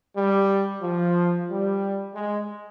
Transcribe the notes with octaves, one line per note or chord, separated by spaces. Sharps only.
G3
F3
G3
G#3